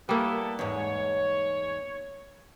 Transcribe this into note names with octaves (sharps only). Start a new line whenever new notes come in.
G3 A#3 B3 E4 A4
E2 G#2 C#5